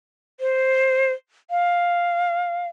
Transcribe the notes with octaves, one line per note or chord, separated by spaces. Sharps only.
C5
F5